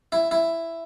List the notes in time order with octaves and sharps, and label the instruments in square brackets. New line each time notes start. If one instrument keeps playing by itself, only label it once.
[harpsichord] E4
E4